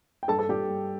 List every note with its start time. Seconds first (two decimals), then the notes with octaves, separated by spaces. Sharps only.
0.23 G5
0.28 G2 A4 A5
0.39 A4 A5
0.49 G3 G4 G5
0.70 G2